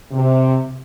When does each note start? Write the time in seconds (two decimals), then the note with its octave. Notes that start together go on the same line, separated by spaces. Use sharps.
0.12 C3